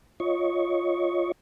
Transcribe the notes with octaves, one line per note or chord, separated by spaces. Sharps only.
F4 C#5 D#5 C#6